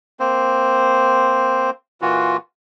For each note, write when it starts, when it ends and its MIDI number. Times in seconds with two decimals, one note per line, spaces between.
0.20 1.70 58
0.20 1.70 60
0.20 1.70 72
2.02 2.37 46
2.02 2.37 52
2.02 2.37 65
2.02 2.37 66